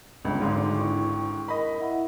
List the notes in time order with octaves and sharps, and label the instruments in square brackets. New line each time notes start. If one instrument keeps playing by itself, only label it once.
[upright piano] G1 C#2 [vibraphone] D4
[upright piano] G#1 G#2 D3 [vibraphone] D4 C6 D6
[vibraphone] E4 G5 C#6
[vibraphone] A#4 [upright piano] D#5 B5
[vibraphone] E4 E5 F#5